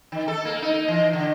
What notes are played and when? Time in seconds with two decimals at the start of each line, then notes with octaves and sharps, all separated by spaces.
0.12 D#3
0.28 A4
0.45 A#3
0.62 D#4
0.88 E3
1.13 D3